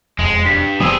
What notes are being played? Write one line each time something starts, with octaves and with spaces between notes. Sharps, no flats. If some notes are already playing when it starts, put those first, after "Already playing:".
E1 F2 G#3
G2 B6
F#1 B2 F3 G3 G#4 D#6 E6